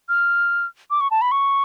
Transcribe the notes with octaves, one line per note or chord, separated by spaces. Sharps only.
F6
D6
C#6
A5
B5
C#6